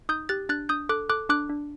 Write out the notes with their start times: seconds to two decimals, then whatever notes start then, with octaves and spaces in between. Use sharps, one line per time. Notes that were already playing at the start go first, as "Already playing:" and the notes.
0.09 D#4 D#6 G6
0.29 G4 F#6 A6
0.49 D4 F#6 A6
0.69 D4 D#6 G6
0.89 A4 D6 F#6
1.10 A4 D6 F#6
1.29 D4 D6 F#6
1.49 D4